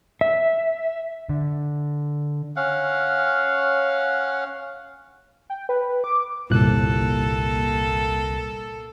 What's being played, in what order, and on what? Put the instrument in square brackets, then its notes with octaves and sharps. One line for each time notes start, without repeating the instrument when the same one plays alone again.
[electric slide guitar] E5
[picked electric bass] D3
[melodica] C#4 F5 F#5
[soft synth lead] G5
B4
D6
[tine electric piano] G1 C2 F#6 [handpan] A#2 [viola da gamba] A#3 A4